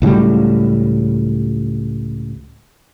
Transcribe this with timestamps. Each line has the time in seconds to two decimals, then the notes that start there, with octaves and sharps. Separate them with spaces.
0.02 C#2 A2 F#3 G3